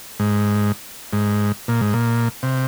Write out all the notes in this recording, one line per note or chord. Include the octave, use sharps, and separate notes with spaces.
G#2
G#2
A#2
G#2
A#2
C3